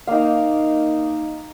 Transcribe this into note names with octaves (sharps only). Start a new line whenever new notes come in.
A#3 D#4 F5